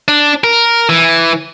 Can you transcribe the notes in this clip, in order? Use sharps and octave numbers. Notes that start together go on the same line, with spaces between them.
D4
A#4
E3